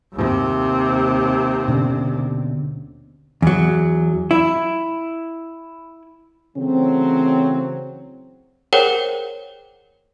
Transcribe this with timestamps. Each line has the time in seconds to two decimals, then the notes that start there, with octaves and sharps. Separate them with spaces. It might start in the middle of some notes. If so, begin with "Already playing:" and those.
0.13 D#2 C3
1.68 B2 D3 C#4
3.42 E2 F#3
4.31 E4
6.57 C#3 E3 F#3 A3 C4
8.73 G#4 A#4 C5 C#5 F#5 G5